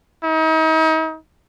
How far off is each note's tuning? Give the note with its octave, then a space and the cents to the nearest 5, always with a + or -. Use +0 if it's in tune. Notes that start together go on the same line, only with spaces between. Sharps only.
D#4 +40